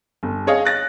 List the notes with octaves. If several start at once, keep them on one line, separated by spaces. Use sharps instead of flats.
G1
G#4 C#5 D#5 F5
F#6 A6 A#6